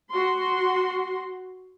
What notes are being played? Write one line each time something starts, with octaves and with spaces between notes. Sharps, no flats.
F#4 C6